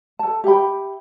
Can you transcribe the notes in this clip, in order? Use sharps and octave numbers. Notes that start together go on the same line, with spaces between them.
A4 A5
G4 E5 G5 B5